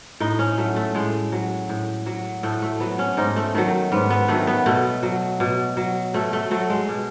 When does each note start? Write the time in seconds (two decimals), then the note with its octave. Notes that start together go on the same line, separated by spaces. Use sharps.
0.20 A2 D#4
0.39 C#4
0.58 F#3 A3
0.76 A3
0.95 A2 G#3
1.32 F#3
1.69 A2
2.06 F#3
2.43 A2 A3
2.62 A3
2.80 F#3 B3
2.99 C#4
3.17 G#2 D#4
3.36 A3
3.55 D#3 F#3 A3
3.92 G#2 B3
4.10 B3
4.28 D#3 F#3 A3
4.47 B3
4.66 B2 A3
5.03 F#3
5.40 B2
5.77 F#3
6.14 B2 A3
6.33 A3
6.51 F#3 A3
6.70 G#3
6.89 B2